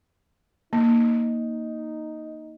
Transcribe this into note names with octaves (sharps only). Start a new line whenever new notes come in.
A#3 D#4